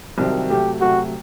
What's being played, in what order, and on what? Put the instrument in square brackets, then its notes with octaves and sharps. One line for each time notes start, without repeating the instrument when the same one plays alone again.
[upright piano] C2 C3 D#3 F#3 C4
[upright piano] C3 F#3 A3 [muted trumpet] G4
[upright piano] C3 F#3 A3 [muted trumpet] F#4